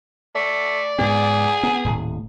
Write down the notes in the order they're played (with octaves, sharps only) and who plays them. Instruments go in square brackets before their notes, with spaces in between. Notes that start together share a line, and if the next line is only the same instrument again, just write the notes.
[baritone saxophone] A3 [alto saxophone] D5
[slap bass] G#2 B3 [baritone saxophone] G#4
[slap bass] B3
D#1 A2